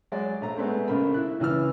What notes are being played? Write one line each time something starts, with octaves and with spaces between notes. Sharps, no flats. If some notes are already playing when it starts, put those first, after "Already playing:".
F#3 G#3 D5
A#1 A3 A#5
G#3 A3 B3 C4 D4
A#1 C#3 A#4 B5
E4 F#6
C#2 E3 B4 E6 F6